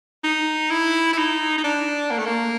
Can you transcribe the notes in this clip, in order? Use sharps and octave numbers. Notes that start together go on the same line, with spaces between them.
D#4
E4
E4
D#4
D#4
D4
A#3
A3
A#3